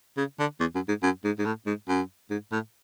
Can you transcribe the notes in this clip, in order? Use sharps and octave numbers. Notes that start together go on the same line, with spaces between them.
C#3
D3
E2
F#2
G#2
F#2
G#2
G#2
A2
G#2
F#2
G#2
A2